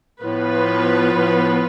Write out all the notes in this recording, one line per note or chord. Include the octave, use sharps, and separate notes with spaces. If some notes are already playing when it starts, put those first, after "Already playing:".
A2 F3 B3 F4 B4
A2